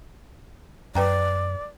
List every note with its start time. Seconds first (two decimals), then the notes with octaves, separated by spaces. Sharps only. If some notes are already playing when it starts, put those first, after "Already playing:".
0.95 F#2 B4 D5 G5 A#5